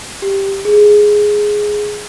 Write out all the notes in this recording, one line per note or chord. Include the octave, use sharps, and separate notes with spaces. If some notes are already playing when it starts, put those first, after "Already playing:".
G4
G#4